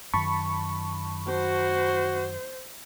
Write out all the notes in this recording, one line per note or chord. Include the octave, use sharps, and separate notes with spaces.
F#2 D#3 A5 B5 C#6
F#4 C5